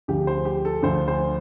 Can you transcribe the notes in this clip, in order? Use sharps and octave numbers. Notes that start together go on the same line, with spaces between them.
D2 D3 F3 G4
C5
G4
A4
D2 D3 F3 C5
C5